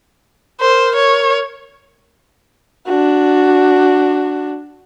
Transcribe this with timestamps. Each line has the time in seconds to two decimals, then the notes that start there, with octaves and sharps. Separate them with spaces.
0.61 A#4 C5
0.96 C#5
2.86 D4 F#4